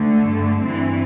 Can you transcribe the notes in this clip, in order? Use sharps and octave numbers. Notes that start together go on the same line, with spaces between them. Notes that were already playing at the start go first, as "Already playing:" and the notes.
Already playing: D2 D3 A3
G2 D3
G2 E3 C4